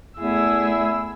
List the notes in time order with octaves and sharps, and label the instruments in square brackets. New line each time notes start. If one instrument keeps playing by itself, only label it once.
[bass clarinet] E2 [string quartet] A3 G#4 [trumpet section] E4 [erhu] E6